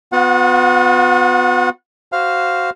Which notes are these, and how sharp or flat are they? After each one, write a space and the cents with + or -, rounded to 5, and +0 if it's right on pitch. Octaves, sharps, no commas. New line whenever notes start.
B3 +25 F#4 -45 F#5 -25
F#4 +10 C5 +0 F5 +0